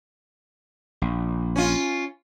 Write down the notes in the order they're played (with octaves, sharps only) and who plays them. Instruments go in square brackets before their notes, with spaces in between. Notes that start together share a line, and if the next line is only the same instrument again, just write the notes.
[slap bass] A#1
[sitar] C#4 F4